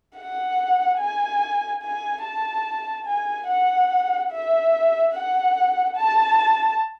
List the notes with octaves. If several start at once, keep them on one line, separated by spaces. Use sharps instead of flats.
F#5
G#5
G#5
A5
G#5
F#5
E5
F#5
A5